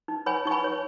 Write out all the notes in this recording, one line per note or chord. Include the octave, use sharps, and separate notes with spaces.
D#4
C#5 G#5 B5
D#4 C#6
G#5 B5
C#5